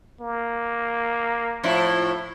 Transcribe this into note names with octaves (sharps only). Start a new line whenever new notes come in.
A#3
A2 F3 E4